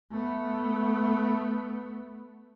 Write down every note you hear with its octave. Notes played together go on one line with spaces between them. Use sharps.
A3 B3